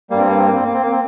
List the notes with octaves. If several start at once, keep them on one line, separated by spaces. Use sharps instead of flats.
G2 G3 A#3
C4
A#3
C4
A#3
C4
A#3
C4
A#3
C4